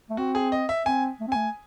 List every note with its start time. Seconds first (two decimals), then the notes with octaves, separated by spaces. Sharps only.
0.10 A3
0.17 C4 F#4
0.35 G#4
0.52 D#5
0.69 E5
0.86 C4 G#5
1.20 A3
1.28 C4
1.32 A3 G#5